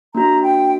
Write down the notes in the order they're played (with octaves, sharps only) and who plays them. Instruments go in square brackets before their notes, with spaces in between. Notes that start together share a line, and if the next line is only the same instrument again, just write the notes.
[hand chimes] A#3 D4 F#4 [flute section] A#5
[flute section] G5